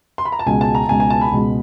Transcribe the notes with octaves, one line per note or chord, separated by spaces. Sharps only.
C6
B5
A#5
A5
C#2 B2 G#3 G#5
A5
A#5
C#2 B2 G#3 G#5
G#5
A5
B5
C#2 B2 G#3